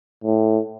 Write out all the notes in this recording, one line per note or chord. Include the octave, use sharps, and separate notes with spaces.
A2